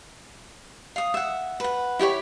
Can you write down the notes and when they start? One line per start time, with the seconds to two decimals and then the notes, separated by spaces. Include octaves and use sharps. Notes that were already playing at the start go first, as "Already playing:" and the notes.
0.96 F5 D#6
1.14 E5 F#5
1.60 B4 F#5
1.99 E4 G4 C5 C#5